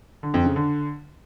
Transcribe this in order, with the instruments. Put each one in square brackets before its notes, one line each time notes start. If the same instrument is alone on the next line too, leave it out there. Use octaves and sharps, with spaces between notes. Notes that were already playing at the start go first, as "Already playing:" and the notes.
[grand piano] D3
F2
C#3
D3